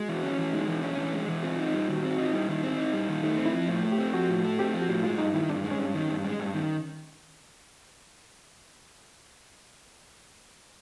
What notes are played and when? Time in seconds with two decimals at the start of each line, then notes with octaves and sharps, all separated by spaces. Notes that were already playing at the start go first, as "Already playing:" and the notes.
Already playing: G#3 F#4
0.08 E3
0.23 C#4
0.38 E3
0.53 G#3 D#4
0.68 E3
0.76 D4
0.83 C#4
0.98 E3
1.13 G#3
1.29 E3
1.43 C4 F4
1.59 D#4
1.74 G3
1.89 D#3 F#4
2.04 C4
2.11 F#4
2.18 D#4 F4
2.33 G3 E4
2.49 D#3
2.63 C4
2.78 D#4
2.93 G3
3.09 D#3
3.23 A3 D#4
3.39 C4
3.46 E4
3.53 F3
3.68 A2 F4
3.83 A3
3.92 G4
3.98 C4
4.13 F3 F#4
4.29 A2
4.44 A3
4.59 C4 G4
4.74 F3
4.82 F#4
4.89 A2
5.03 G#3 F4
5.18 G2 D#4
5.34 D#3 E4
5.49 G2 D4
5.64 G#3
5.71 C#4
5.78 G2
5.94 D#3
6.09 G2
6.24 G#3
6.40 G2
6.54 D#3